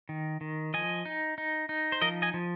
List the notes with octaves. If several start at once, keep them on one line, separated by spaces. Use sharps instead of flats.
D#3
D#3
F3 D#5 G#5
D#4
D#4
D#4
C5
F3 A#4 D#5
D#5 G#5
F3